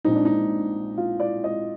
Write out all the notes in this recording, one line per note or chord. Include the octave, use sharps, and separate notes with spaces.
A#1 A#2 G#3 C4 D#4
D4
D#4
F4
D5
D#5